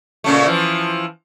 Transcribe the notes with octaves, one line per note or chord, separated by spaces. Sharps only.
A#2 C#3 A3
E3 F3